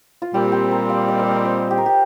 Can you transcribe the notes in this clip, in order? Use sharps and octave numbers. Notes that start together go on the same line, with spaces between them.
F4
A#2 G3 C4 G4
G4
A#4
F5
D#5
C5
D#5
C5
G4
A#4
G4